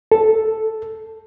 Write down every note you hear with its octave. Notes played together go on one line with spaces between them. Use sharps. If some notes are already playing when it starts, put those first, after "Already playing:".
A4